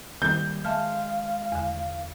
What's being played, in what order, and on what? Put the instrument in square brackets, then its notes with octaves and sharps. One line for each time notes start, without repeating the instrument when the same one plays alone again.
[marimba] D#3 [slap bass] G3 A3 A#3 [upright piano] G6
[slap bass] G#3 [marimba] E5 A5 F6 [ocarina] F5
[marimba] E2 D3